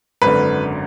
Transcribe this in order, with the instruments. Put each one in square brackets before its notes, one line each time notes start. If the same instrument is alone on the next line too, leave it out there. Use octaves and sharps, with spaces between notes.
[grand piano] G#1 F#2 D3 [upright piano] B4